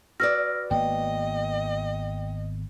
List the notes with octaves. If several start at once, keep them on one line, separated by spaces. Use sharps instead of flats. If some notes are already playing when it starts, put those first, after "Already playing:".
F#4 B4 D5 E6 F6 A#6
G#1 A#3 B3 D#5 G5